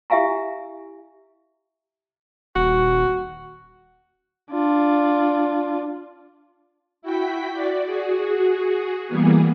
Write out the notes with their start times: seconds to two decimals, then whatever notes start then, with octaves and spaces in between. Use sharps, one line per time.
0.10 E4 G4 E5 F5 G#5 A#5
2.56 D#1 F#4
4.51 D4 F4
7.02 E4 F#4 G5 B6
7.50 F#4 D5
7.86 F#4 G#4
9.08 E3 G3 A#3 B3 G#4